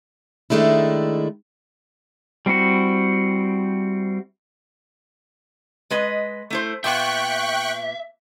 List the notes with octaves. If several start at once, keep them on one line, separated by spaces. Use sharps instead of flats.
D#3 G#3 A3 D4 E4
G3 C4 E4 F#4
G#3 B4 D#5
A3 E4 C5
A#2 A#3 B3 E5 G5 C#6 F#6